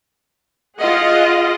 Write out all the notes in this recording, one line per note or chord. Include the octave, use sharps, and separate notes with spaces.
F4 G#4 D#5 F#5